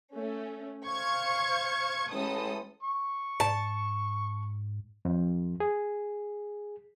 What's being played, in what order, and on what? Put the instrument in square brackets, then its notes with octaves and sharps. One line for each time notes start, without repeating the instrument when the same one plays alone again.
[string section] A3 C#4
C5 F5 C#6 G#6
A1 G#3 A4 D#6
[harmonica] C#6
[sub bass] G#2 [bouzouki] A5
[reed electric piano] F2
G#4